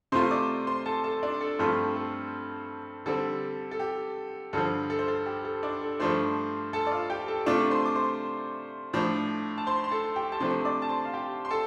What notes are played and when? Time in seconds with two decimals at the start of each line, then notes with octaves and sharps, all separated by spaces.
0.12 C3 A3 F4 C5 C6
0.31 D5 D6
0.67 C5 C6
0.86 A4 A5
1.04 A4 A5
1.23 D4 D5
1.41 A4
1.59 G2 F3 A3 C4 F4 C5
1.96 A4
3.06 D3 G3 C4 A4
3.71 A4
3.79 G4
4.53 G2 D3 F3 A4
4.90 A4
4.99 C5
5.08 A4
5.26 G4
5.45 A4
5.63 D4 D5
5.81 A4
5.99 G2 F3 A3 D4 C5 C6
6.73 A4 A5
6.87 D5
6.92 F4 F5
7.10 G4 G5
7.28 A4 A5
7.46 C3 A3 D4 F4 D5 D6
7.71 C5 C6
7.86 D6
7.95 C5 C6
8.93 A2 F3 D4
9.58 A5
9.67 C5 C6
9.84 C6
9.91 A4 A5
10.16 G4 G5
10.32 A5
10.40 C3 F3 A3 D4 C5 C6
10.65 D5 D6
10.82 A5
10.89 C5 C6
11.05 F5
11.13 G4 G5
11.45 C6
11.51 A4 A5